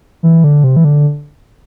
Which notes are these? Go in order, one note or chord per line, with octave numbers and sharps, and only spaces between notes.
E3
D3
C3
E3
D3